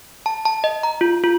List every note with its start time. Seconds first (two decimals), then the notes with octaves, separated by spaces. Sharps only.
0.26 A5
0.45 A5
0.64 D#5
0.83 A#5
1.01 F4
1.24 F4